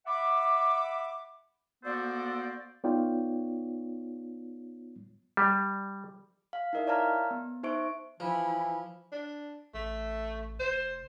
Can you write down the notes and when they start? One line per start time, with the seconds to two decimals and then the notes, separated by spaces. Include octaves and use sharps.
0.07 E5 F#5 B5 D6
1.84 A#3 B3 F#4 A4 C5 D5
2.84 B3 D#4 F4 C#5 D5 G5
5.37 G3
6.53 F5
6.73 D#4 E4 A#4 D#5 E5
6.87 C#5 D5 F5 A5 A#5 F6
7.31 B3
7.63 D#4 C5 E5 C#6 D7
8.20 E3 F3 E4 B5
9.12 D4
9.74 A1 A3
10.60 F1 C5